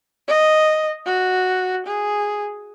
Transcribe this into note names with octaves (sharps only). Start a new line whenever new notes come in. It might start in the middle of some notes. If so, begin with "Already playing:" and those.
D#5
F#4
G#4